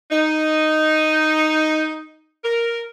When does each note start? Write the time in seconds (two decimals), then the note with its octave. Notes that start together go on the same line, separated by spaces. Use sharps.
0.11 D#4
2.44 A#4